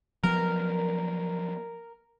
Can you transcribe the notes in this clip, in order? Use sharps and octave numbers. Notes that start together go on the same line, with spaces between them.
F3 F#3 B3 A#4